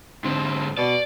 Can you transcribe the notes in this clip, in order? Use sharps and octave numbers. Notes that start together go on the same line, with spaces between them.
G#2 D3 C4
B2 D5